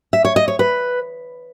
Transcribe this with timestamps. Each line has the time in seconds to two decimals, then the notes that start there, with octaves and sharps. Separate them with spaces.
0.13 E5
0.25 C#5
0.36 D#5
0.48 C#5
0.59 B4